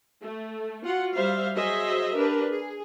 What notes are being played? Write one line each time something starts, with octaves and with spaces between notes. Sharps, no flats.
A3
F4 F#4 F#5
G3 C5 E5 F5
F#3 G#4 C5 D#5 E5
D4 G4 A#4 B4
G#4